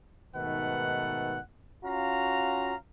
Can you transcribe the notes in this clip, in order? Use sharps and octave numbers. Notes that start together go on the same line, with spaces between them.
G#2 B2 D#3 A3 B4 F#5
C#4 F4 F#4 F5 A#5